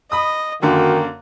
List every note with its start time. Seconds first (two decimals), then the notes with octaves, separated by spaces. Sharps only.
0.12 D#5 B5 D#6
0.62 F#2 D3 D#3 A#3 F#4